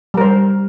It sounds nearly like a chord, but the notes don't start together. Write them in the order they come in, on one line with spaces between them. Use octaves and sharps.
G3 A#4 C5